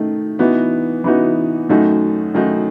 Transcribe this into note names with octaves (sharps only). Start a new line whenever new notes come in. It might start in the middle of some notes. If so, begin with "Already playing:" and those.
Already playing: D#3 A3 D#4
E3 B3 D#4 F#4
E3 B3 D#4 F#4
F#2 D#3 A3 D#4 F#4
F#2 D#3 A3 D#4 F#4